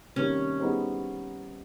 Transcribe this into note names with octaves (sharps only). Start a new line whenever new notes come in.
C3 D#3 G3 A#3 C#4 D4
G3 B3 D#4 G#4 C5